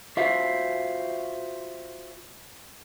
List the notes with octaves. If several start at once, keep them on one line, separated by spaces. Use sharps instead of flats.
F4 F#4 C5 E5 F5